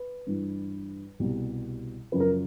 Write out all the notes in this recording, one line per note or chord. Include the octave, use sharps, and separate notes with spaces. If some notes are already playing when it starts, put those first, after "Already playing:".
Already playing: B4
G2 E3 G3
C2 B2 G3
F#2 C#3 F3 B4
A#4